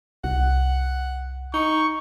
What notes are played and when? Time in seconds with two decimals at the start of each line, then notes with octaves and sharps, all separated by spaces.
0.24 C2 F#5
1.54 D#4 C#6